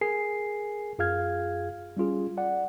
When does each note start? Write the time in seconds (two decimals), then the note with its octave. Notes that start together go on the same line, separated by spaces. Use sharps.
0.01 G#4 A#4 G#5 C7
0.99 F#2 F4 G#4 F5 F6 G#6
1.97 G3 C#4 F4 G#4
2.37 D5 F#5